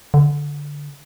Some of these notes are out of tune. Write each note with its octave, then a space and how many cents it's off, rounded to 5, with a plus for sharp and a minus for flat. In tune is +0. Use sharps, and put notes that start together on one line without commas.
D3 -10